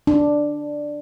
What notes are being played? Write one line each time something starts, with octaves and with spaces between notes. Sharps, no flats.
D4